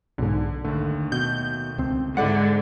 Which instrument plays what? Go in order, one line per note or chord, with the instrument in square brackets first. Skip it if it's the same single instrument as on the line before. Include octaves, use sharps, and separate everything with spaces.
[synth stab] B1 G#2 [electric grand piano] D3
[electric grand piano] D#2 A3 [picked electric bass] D3
[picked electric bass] B2 [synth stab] G6
[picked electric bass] C#2 C4
[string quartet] G#2 D3 [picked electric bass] G#3 [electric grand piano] E4 D5 C#7 [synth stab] F#5